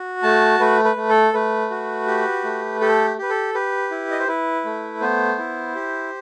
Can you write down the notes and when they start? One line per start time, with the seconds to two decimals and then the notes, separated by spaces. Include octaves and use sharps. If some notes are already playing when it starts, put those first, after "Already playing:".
Already playing: F#4
0.23 A3 A5
0.60 A3 B4
0.85 B4
0.96 A3
1.09 A4
1.34 A3 B4
1.70 F#4
2.07 G4
2.44 A3
2.81 G4 A4
3.18 G4 B4
3.30 A4
3.54 G4 B4
3.91 E4
4.11 D#5
4.20 C5
4.28 E4 B4
4.65 A3
5.01 B3 C5
5.38 E4
5.75 G4